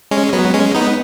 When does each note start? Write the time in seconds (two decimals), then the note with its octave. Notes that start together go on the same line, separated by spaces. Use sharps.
0.11 G#3 C#4
0.33 F#3 B3
0.54 G#3 C#4
0.75 B3 D#4